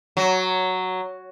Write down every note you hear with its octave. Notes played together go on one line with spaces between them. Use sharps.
F#3